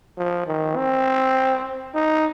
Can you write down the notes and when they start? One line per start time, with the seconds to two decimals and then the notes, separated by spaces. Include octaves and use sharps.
0.17 F3
0.47 D#3
0.76 C4
1.95 D#4